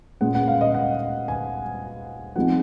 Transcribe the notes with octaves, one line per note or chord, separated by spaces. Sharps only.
A#2 G#3 C#4 F#5
F#5
F5
D#5
F#5
G#5
F3 G#3 C4 D#4 F#5